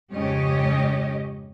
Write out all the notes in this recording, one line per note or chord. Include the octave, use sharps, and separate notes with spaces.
F2 G#2 C#3 G4 C#5 D#5